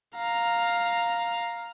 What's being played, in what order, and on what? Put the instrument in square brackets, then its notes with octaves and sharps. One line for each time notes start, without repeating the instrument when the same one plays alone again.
[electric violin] F5 A#5